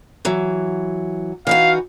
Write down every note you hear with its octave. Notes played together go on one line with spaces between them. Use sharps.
E3 F#3
E3 D#4 F#4 F5